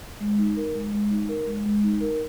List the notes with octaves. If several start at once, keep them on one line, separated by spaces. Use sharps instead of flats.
G#3
D#4
A#4
G#3
G#3
D#4
A#4
G#3
G#3
D#4
A#4